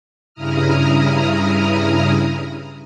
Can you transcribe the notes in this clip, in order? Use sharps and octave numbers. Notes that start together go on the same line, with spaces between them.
G2 C#3 E4 A#5 D#6 F6